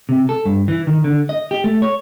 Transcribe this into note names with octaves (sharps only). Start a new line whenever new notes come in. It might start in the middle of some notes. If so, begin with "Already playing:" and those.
C3
A4
G2
E3
D#3
D3
D#5
G4
A3
C#5